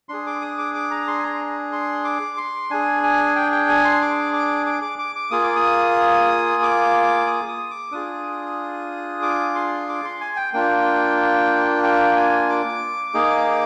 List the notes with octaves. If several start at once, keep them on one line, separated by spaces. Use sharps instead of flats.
D4 G#4 C6
D6
D#6
D6
D6
A#5
C6
G#5
A#5
C6
D6
C6
D4 G#4 G#5
G#5
G5
G5
G#5
C6
D6
D6
D6
D6
D6
D6
A#3 F4 G#4 D#6
D6
D#6
D6
D#6
D#6
D6
D4 F4 G#4 D#6
D6
C6
D6
C6
G#5
G5
A#3 D4 F4 G5
G5
G#5
D6
A#3 D#4 G#4